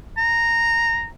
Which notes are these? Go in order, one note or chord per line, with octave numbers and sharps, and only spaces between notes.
A#5